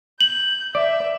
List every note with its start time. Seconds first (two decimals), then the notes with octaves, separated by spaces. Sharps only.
0.21 G6 F#7
0.75 D5 E5